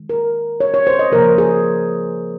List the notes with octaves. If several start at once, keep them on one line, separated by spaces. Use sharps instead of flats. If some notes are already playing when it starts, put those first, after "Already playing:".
Already playing: D#3 G#3
A#4
C#5
C#5
C5
D#5
C#3 F3 A#3 A#4
G#4